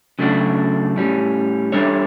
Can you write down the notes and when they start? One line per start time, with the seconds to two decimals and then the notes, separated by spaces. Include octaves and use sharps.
0.19 C#3 F#3 A3 D4 F#4
0.96 A2 G3 C#4
1.72 G3 D4 A4 C#5 E5